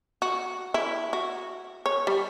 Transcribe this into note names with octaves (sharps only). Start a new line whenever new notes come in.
F#4
E4
F#4
C#5
G3